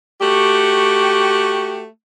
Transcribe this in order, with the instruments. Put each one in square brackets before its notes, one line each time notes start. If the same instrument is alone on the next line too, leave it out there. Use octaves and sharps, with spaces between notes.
[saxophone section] A3 F#4 G4